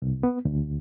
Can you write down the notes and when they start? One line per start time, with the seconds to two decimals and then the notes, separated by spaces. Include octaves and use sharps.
0.02 C2
0.23 B3
0.45 D2